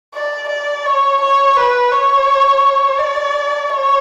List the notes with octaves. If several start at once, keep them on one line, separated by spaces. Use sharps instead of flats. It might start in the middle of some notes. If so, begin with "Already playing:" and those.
D5
D5
C#5
C#5
B4
C#5
D5
C#5